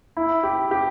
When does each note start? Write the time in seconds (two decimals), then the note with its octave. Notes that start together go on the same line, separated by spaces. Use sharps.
0.17 E4
0.43 G4
0.71 G4